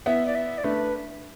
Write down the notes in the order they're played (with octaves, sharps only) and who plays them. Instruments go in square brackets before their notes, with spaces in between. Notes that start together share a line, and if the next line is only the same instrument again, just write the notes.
[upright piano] B3 E4 [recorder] E5
[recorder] D5
E5
D5
[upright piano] A3 D4 [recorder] B4